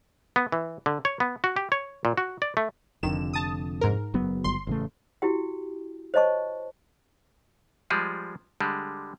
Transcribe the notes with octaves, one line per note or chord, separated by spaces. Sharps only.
B3
E3
D3
C#5
B3
F#4
G4
C#5
A#2
F#4
D5
A3
F1 F2 D3 D#3 E7
A5 D#6
G#2 A#4
F#1 F#3 B3
G1 C6
A1 C#3 A3
E4 F#4 G4 G5
C5 C#5 D#5 A5 C#6
F3 G3 G#3 G#4
D3 G3 G#3